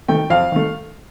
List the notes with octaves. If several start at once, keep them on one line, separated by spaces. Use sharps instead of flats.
D#3 A3 G5
F2 F5
D#3 A3